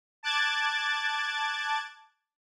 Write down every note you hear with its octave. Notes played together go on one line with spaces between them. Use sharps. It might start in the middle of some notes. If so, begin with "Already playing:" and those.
A5 D6 F#6 G#6 A6